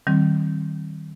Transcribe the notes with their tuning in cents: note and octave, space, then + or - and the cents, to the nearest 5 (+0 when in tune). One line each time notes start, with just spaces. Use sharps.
D#3 +0 G3 -30 C4 +20